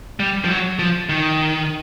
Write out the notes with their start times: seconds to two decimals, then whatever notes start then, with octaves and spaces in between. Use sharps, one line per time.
0.20 G3
0.44 F3
0.50 F#3
0.79 F3
1.09 D#3